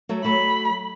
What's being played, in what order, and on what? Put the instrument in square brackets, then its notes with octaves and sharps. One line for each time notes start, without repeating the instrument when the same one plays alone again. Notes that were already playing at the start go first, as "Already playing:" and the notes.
[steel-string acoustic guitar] F#3 A3
[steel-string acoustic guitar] F#3 A3 [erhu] B5